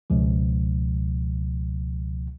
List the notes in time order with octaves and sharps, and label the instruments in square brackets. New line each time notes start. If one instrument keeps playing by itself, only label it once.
[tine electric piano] C#2 B2 F3